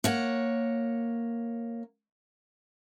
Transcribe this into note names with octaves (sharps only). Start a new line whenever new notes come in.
A#3 C#5 F#5